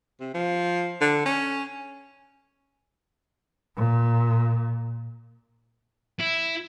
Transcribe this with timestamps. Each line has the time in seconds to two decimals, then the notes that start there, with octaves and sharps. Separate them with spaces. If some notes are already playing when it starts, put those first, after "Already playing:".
0.21 C3
0.35 F3
1.01 D3
1.26 C#4
3.76 A#2
6.20 E4